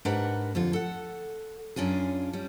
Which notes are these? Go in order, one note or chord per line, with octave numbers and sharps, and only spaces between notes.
G#2 D4 G4 A#4 B4 F#5
F2 D3 F4
A4 F#5
F#2 C#4 D4 F4 G#4
G3 C#4